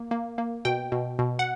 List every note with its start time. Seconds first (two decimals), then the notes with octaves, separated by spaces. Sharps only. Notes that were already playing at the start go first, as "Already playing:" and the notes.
Already playing: A#3
0.11 A#3
0.38 A#3
0.65 B2 G5
0.92 B2
1.19 B2
1.39 F#5